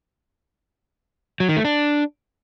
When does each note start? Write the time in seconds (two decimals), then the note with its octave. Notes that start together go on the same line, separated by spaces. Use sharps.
1.40 F#3
1.48 D#3
1.57 A3
1.65 D4